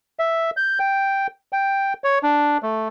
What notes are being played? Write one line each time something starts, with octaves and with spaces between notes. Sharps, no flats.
E5
G6
G5
G5
C#5
D4
A3